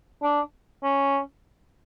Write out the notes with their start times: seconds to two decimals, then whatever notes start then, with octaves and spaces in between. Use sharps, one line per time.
0.22 D4
0.83 C#4